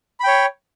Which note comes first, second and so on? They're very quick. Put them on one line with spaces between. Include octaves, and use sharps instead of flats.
B5 G5 C#5